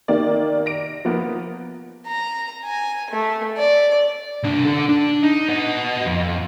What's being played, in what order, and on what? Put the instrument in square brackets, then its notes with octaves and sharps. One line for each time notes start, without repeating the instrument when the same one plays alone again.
[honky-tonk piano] D#3 A#3 G4 D5
A#6 D7
F3 A#3 B3
[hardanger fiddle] A#5
G#5
A3
D5
[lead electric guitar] C2 D4
D4 A4
D4
D#4
B3 D#5
F2